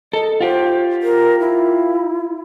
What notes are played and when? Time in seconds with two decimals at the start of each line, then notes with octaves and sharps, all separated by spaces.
0.13 A4 D#5
0.41 F4 G4 C5
1.03 A#4
1.40 E4